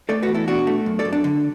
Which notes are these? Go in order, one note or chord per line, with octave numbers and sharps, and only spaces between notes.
A3 A4 D5
F#4 B4
E2
E4 A4
B2 D4 F#4
A3
F#2
A4 D5
F#2
D4
D3